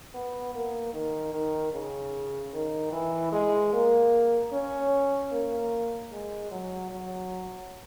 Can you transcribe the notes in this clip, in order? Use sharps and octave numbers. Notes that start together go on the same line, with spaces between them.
B3
A#3
D#3
D#3
C#3
D#3
E3
G#3
A#3
C#4
A#3
G#3
F#3
F#3